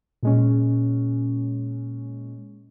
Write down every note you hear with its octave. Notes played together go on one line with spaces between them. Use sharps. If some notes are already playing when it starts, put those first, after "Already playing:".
A#2 G#3 C#4